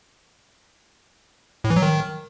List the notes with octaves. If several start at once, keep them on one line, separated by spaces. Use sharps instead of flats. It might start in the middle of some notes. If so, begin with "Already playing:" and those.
A2
E3
F#3
D#3